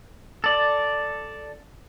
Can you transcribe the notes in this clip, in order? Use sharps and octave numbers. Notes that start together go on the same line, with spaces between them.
A4 D5